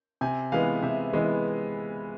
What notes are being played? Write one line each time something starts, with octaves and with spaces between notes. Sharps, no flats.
C3 G#5
E3 G#3 B3 F5
C3 E5
E3 G#3 B3